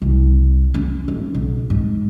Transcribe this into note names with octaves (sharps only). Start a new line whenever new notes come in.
C2
C#4
G#1
B1
G#2